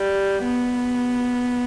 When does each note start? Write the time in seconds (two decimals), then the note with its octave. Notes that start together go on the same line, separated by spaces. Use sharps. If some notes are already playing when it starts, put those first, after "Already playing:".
Already playing: G3
0.44 B3